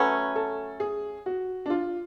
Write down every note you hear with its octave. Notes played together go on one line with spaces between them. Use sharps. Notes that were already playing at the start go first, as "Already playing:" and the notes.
Already playing: F#3 A3 C#4 B4
A4
G#4
F#4
D4
F4